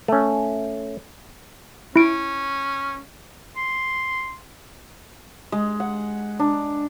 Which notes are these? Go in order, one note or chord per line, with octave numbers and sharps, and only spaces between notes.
A3 C#4
C#4 E4 D7
C6
G#3
F#5
D4